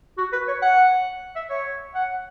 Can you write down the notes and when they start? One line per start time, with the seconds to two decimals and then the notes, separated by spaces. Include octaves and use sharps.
0.18 F#4
0.33 B4
0.48 C#5
0.62 F#5
1.36 E5
1.50 C#5
1.95 F#5